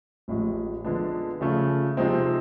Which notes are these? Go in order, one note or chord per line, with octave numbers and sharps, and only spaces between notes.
A1 A2 F3 G#3
D3 F3 G#3 B3 D4
C#3 F3 A3
C3 F3 G#3 C4 D#4